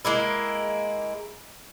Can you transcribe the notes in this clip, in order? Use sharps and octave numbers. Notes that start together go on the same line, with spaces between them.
G#3 A#3 E4